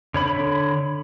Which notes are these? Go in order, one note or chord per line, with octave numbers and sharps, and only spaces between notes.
D3 C#5 B5